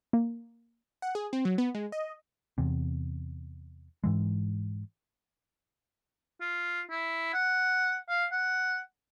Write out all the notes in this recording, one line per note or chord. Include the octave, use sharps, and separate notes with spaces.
A#3
F#5
G#4
C4
F#3
B3
G#3
D#5
E2 C3
G#2 E3 G#3
F4
E4
F#5
F5
F#5